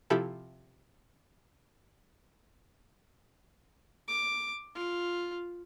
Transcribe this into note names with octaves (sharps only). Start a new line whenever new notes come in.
C3 F3 C4 E4 G4 A4
D6
F4